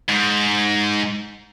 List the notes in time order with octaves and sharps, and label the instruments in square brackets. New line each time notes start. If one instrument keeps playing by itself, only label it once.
[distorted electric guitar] G#2